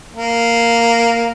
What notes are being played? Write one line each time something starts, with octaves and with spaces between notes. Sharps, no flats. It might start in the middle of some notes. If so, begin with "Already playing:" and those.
A#3